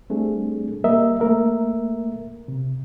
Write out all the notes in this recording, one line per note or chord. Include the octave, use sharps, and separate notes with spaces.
G3 A3 C4 D4 G#4
G3 A#3 A#4 D#5 E5
A3 A#3 A#4 E5
C3